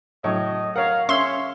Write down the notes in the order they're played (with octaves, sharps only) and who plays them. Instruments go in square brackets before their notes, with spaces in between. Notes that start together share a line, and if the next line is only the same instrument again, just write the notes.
[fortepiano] A2 [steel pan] F#3 C#5 [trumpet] D#5
[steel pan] A#4 C#5 [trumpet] F5 [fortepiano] F#5
[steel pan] C#4 [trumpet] C#5 [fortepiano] E5 F5 E6 [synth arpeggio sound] C6